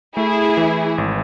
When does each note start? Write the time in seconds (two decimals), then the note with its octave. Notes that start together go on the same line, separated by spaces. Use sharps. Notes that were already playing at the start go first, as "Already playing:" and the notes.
0.17 A3 E4 G#4
0.57 E3
0.98 G#1